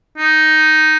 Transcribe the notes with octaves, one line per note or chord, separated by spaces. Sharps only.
D#4